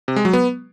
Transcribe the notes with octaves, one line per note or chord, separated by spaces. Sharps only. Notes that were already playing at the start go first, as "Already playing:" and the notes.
C3
G#3
F#3
B3